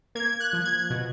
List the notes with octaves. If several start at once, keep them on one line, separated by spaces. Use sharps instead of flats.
A#3 G#6
F#6
F3
G#6
B2